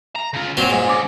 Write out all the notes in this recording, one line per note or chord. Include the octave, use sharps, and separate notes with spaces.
A#5
C#3 F4
A#2 F#3 C4 G7
G#2
C#3 D6